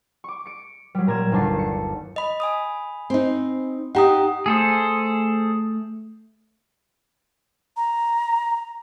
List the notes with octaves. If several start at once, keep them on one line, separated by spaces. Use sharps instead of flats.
C#6 D6
C#7 D7
F#3 G3
A#2 A#5 G#6 E7
G1 D#2 D4 A5 C7
C#7
D#5 B5
G#5 B5 D#6
C4 D#4
D#4 G4 F#5 A#5 D#6
A3 G#4 A4 C5
A#5